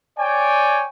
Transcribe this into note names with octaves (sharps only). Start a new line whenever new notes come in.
C#5 D5 G5 G#5